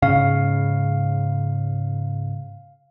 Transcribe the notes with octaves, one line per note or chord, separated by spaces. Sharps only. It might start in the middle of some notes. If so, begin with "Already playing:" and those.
G#2 C#3 C#4 F5